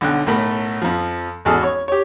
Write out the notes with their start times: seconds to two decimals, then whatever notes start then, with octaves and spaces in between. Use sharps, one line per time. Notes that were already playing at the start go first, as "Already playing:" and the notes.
0.01 B1 D3 G5 F#6
0.26 B1 A2 A3 A#4 B5
0.82 F2 F3
1.45 G#1 E2 F#4 G#4 A4 F6
1.63 C#5 C#6
1.88 G4 C#5